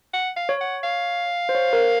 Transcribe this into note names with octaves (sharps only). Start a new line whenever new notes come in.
F#5
F5
C#5
F#5
C#5 F5
C5
C#5
A#4